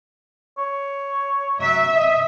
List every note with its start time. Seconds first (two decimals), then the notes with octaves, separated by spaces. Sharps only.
0.58 C#5
1.61 F#3 E5
1.95 D#5